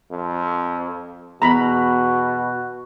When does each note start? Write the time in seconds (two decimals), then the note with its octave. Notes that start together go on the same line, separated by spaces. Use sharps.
0.11 F2
1.42 E2 B2 F#4 A#5 B5